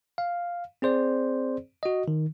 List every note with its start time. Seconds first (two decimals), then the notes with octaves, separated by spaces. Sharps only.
0.18 F5
0.82 C4 G#4 C5 D5
1.83 F#4 D#5
2.08 D#3